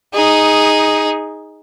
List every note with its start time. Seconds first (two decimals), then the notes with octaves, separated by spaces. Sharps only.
0.14 D#4 G#4